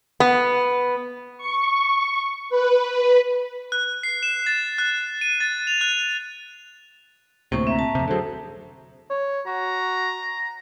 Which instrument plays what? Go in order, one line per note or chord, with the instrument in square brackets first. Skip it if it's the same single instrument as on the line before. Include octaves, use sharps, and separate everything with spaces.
[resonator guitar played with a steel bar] B3
[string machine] C#6
B4
[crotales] F#6
C7
E7
A6
F#6
D#7
A6
F7
F#6
[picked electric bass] D2 A2 C3 [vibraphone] A#3 C5 C#6
[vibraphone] C4 [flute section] E5 A#5
[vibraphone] A5
[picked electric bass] F2 C3
[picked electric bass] D3 F#3 [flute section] G#4 A4 C5
[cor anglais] C#5
[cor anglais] F#4 [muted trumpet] A#5